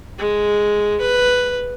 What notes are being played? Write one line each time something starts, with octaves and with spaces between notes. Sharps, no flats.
G#3
B4